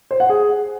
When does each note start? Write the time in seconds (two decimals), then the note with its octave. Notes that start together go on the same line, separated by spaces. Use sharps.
0.11 C5
0.20 F#5
0.29 G#4